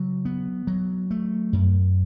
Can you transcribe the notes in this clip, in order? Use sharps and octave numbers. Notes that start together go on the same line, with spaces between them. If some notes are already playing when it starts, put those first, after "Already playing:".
Already playing: C#3 F#3
B3
F#3
A3
F#2